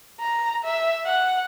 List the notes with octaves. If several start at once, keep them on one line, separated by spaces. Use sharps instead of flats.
A#5
E5
F#5